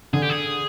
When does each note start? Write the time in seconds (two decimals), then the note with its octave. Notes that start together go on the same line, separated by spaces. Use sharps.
0.13 D3 G#4
0.22 G4
0.30 G#4